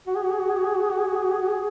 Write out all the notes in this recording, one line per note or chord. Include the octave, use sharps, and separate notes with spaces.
F#4
G#4
F#4
G#4
F#4
G#4
F#4
G#4
F#4
G#4
F#4
G#4
F#4
G#4
F#4
G#4
F#4
G#4